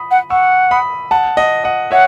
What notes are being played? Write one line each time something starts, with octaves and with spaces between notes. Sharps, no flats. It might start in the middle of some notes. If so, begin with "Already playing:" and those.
Already playing: B5 D#6
F#5
F#5 C#6 E6
B5 D#6
F#5 A5
D#5 F#5
D#5 F#5
C#5 E5 F#5